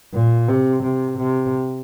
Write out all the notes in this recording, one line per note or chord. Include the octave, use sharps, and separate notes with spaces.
A#2
C3
C3
C3